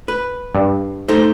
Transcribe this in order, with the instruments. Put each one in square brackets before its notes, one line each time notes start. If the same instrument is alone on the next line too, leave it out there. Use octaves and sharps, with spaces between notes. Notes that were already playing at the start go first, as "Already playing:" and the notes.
[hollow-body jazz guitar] B4
[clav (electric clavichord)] G2
[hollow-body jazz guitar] A3 D#4 C5